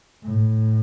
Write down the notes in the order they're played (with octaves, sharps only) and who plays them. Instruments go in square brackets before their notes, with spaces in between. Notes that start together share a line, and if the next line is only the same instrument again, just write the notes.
[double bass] A2